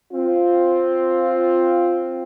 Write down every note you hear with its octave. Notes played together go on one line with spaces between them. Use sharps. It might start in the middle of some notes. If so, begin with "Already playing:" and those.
C4 F4